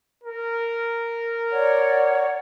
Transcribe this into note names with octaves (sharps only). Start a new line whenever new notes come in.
A#4
C#5 D5 F#5